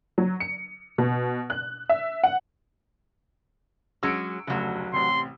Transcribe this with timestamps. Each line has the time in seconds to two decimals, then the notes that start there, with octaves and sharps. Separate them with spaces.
0.18 F#3
0.40 C#7
0.98 B2
1.50 F#6
1.89 E5
2.23 F#5
4.03 F#3 G#3 C#4 E6 C#7 D7
4.47 F1 D2 C#3 F#3
4.93 A1 C3 C6